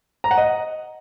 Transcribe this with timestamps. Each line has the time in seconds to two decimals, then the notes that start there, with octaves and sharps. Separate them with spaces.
0.24 A#5
0.31 F#5
0.38 D#5